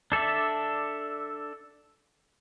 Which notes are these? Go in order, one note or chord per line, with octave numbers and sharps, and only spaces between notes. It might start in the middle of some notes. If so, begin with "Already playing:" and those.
D4 A4 D5 E5